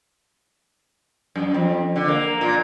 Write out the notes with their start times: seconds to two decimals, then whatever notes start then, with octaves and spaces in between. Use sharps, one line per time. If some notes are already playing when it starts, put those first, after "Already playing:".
1.36 F#2
1.54 F2
1.96 D3
2.08 A#3
2.41 A#2